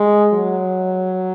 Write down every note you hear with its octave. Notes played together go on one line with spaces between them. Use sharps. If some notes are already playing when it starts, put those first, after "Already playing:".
Already playing: G#3
F#3